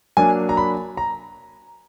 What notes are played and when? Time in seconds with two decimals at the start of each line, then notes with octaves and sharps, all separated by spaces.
0.17 F#3 A#3 D4 G#5
0.49 A#5
0.57 B5
0.97 A#5